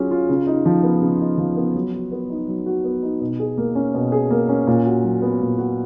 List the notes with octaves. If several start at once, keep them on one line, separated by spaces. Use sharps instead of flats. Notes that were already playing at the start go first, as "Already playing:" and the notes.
Already playing: F#3 C#4 F4 G#4
F4
C#3
D#4
F3
B3
C#3
D#4
F3
B3
F#3
F#4
B3
D#4
F#3
F#4
B3
D#4
B2
G#4
A#3
C#4
B2
G#4
A#3
C#4
A#2
F#4
F#3
B3
A#2
F#4